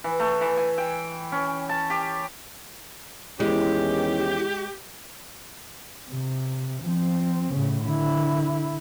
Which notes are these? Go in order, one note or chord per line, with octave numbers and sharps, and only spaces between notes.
E3
A3
E3
G#5
G5
C#4
A5
G4
E2 D#3 G#3 C#4 E4 G4
C3
F3 C4
A2 C#3
D3 E4